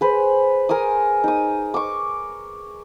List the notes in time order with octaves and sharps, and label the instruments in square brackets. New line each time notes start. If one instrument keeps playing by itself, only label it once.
[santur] G#4 B4 C5
A#4 G#5 C6 D#6
D#4 D#6
C#6 D6